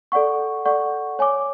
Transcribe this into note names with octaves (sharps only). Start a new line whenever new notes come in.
A4 D5 F#5 C#6
A4 D5 F#5 C#6
C#5 G#5 D6